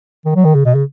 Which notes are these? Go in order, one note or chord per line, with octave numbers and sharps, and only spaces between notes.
D#3
F#3
D#3
C#3
B2
C#3